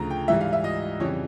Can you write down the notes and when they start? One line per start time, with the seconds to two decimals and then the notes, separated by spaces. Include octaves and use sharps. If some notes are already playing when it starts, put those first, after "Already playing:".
Already playing: D2 C#3 F3 A#5
0.10 G5
0.28 G#2 E3 G3 E5
0.41 F5
0.53 E5
0.64 D#5
1.00 F2 C#3 E3 G3 C#5